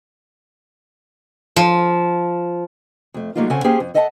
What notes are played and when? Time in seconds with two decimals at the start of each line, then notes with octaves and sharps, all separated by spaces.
1.56 F3
3.14 F2 A3
3.36 F#3 G3 A3 A#3 D#4 F4
3.50 C#3 C4 A4 C#5 F#5 G#5
3.64 A#3 C#4 G4 G#4 C5 G5
3.80 F2
3.94 A4 D#5 E5 F#5 G#5 A5